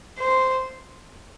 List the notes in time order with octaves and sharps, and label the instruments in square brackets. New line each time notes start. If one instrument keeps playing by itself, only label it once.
[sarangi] C5